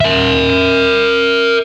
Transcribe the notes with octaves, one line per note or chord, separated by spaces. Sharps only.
A#4 E5